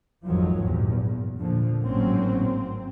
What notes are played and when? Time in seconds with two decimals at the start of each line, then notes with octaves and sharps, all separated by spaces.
0.24 G#1 F2 D#3 F3 F#3
0.62 E2 G2 A#2
1.37 A#2 D3 F3
1.84 G#1 A2 F#3 A#3 C4 C#4
2.43 C4